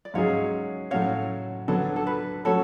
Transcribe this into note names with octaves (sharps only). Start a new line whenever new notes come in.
D5
G#2 F#3 C#4 G#4 C#5 F5
A2 F#3 A3 C#4 F#4 C#5 F5
D3 F#3 B3 D4 A4 C#5
A4
B4
F#3 A3 C#4 F#4 A4 C#5